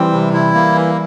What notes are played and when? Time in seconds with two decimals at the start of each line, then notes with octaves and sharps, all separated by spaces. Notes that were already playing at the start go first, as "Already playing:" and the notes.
Already playing: E3 G3 C4
0.12 C3
0.33 E4
0.54 A#3
0.75 E3